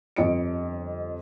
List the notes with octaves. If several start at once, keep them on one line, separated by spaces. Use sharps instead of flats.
G1 F2 D#5 C#7 D7